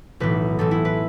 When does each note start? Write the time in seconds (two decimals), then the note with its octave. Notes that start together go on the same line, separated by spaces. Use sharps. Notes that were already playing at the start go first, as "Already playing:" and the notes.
0.20 B1 A2 E3 B4
0.58 A1 A2 E3 A4
0.71 E4
0.85 B4